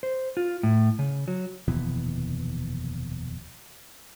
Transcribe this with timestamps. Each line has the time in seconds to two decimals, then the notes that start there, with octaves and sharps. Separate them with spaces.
0.03 C5
0.37 F4
0.63 A2
0.99 C#3
1.28 F#3
1.68 F1 D#2 B2 E3